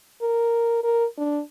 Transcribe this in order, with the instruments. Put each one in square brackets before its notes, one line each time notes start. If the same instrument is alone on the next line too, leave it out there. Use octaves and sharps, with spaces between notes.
[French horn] A#4
A#4
D4